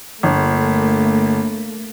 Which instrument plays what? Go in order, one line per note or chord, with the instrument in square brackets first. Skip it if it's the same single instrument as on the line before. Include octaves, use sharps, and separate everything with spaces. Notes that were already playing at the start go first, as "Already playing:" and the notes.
[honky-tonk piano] G1 [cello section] A3 A#3